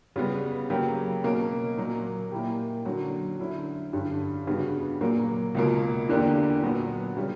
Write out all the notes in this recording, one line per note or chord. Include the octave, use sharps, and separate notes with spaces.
C#3 G3 B3
C#3 F#3 A#3 C#4 G4
B2 A#3 C#4
A#2 F#3 A#3
A#2 A#3 E4 G4
D3 F#3 C#4 F#4
D3 F#3 C#4 E4
G2 D3 G3 C#4
C#3 G3 B3 D4 F#4
A#2 F#3 A#3
C#2 B2 A#3
E2 D3 A#3 D4 G4
A#2 F#3 B3 F#4
C#3 G3 C#4